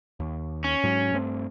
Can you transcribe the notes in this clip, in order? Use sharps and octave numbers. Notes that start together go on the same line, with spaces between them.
D#2
C#4
G#2 F#3
G2 A3 C4